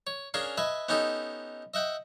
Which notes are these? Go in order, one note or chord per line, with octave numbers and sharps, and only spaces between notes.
C#5
C#4 D4 G#4 A#4 F5
B4 D#5 E5 G#5
B3 C#4 D#4 G4 A4
D#5 E5 F#5 G5